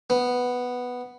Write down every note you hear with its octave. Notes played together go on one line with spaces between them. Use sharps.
B3